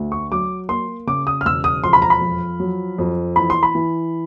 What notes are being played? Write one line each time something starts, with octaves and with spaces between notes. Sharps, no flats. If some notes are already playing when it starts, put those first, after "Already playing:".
Already playing: D2
C#6
F#3 D6
A#3 C6
C#3 D6
D#6
F6
E1 E6
D#6
F2 C6
B5
A#5
B5
F3
F#3
F2
E3 B5
C6
B5
E3